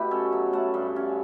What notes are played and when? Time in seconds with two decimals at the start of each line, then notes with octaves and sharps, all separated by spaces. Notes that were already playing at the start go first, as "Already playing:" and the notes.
Already playing: B2 A3 E4 G4 B4
0.11 C#4 A4 C#5
0.32 F#3
0.53 A3 F#5 A5
0.74 G2
0.96 C#4